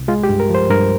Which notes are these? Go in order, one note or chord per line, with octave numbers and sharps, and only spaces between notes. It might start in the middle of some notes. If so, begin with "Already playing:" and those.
Already playing: C2
G#3 F4
G4
G2
A#4
F3 C5
G2 A#4